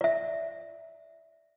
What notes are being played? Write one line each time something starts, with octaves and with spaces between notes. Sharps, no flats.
D5 E5